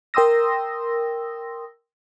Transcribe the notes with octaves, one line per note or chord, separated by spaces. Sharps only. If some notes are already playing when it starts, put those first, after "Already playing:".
A#4 G5 C6 D#6 E6 A#6